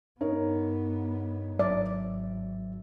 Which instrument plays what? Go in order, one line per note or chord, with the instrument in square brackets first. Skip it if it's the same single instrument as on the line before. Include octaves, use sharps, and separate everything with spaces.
[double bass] G2 B3 [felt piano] D#4 A#4 C#5
[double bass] G#1 [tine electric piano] F#3 E5 [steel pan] D5